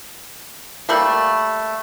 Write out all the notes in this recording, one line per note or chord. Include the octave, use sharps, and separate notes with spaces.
G3 A3 A#3